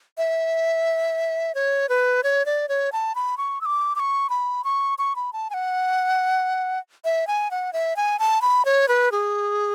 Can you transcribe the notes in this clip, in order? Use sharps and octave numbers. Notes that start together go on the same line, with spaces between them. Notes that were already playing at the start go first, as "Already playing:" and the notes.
E5
C#5
B4
C#5
D5
C#5
A5
B5
C#6
E6
D6
D6
C#6
B5
C#6
C#6
B5
A5
G#5
F#5
E5
G#5
F#5
E5
G#5
A5
B5
C#5
B4
G#4